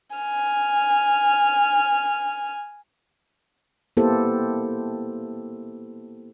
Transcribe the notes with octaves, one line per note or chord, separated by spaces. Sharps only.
G#5 F6
A#3 B3 E4 G4 A4 C5